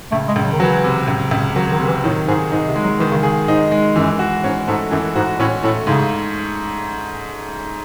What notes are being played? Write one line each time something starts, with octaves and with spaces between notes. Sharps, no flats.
C#2 A3
G#3
C#2
F#3
D#3
E3 F#3
C3
C#2
C#2
D#3 F#3
D#3
C3
E3
A2 D#3
G#2 G#4
G#2 D#4
C3
G#3
F#3
D#3 E3
C#3
C#3 G#4
G#2 D#4
G#3
F#2 E3
F#4
G#2 C#4
G#2 A3
F#2 E3
G#2 F#4
A2 C#4
A2 A3
G#2 C#3